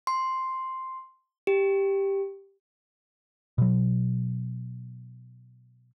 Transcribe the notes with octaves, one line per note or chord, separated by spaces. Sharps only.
C6
G4
B2 F#3